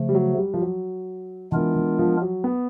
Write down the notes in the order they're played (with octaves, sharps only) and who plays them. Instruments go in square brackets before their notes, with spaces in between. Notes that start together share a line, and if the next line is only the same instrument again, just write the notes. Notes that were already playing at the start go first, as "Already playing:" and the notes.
Already playing: [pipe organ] C#3 F3 A3
[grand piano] G3
F#3
G3
F3
F#3
[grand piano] E3 [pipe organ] G#3 B3 D4 F4 A#4
[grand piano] E3
F3
F#3
B3